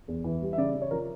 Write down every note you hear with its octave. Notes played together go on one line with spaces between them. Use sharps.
E2
E3
G3
E5
C#3 D5
C#3
C#5
F3 A#4